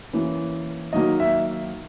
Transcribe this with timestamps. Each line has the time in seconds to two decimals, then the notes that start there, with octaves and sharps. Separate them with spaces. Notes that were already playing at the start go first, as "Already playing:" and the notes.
0.13 E3 A#3 C#4
0.93 D#3 F#3 A#3 D#4 D#5
1.20 E5